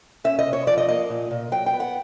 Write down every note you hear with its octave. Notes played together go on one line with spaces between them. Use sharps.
C#4 E5
D#5
C3
C#5
F3 D5
D#5
A#3 D#5
A#2
A#2
F#3 G5
G5
B3
F#5